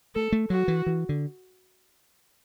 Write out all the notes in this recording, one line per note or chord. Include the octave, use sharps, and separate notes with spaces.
A3 A4
A3
F#3 F#4
E3
E3
D3